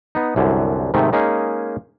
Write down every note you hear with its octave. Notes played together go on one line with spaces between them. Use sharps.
B3 D#4
C2 F#2 D3
G#2 C3 D#3 A3
G#3 A#3 C#4 D#4 G#4